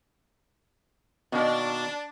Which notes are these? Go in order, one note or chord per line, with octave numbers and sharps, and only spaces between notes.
B2 D#3 A#3 D4